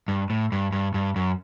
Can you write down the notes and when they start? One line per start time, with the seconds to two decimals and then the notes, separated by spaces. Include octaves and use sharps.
0.08 G2
0.30 A2
0.52 G2
0.72 G2
0.94 G2
1.16 F#2